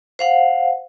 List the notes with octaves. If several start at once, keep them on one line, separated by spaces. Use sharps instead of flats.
C5 F5 F#5